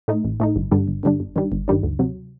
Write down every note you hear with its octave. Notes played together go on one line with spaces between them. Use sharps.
A2 A3 D#4
A1
A2 A3 D#4
G1
G2 D3 G3 D4
G1
G2 D3 G3 D4
G1
G2 D#3 G3 D4
G1
G2 D#3 G3 D4
D2
C3 F#3